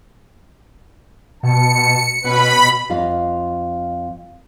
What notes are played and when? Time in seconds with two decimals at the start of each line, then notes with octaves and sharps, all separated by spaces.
1.43 B2 A5 C#7
2.24 B2 C#4 B4 B5
2.90 F2 F4 D#5 F5